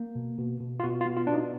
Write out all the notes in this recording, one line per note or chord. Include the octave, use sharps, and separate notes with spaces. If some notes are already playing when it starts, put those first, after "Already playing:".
Already playing: A#3
B2
B2
B2
F4
B2 F#4
F4
B3
F4
B2 D4
D#4